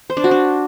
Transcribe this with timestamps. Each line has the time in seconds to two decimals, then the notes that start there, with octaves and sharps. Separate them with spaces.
0.10 C5
0.17 D4
0.24 F#4
0.31 D4